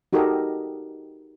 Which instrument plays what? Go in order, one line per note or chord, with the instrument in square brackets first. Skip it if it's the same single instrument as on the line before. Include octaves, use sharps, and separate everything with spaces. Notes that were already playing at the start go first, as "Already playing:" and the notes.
[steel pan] D#4 F#4 G4 A4 A#4 D#5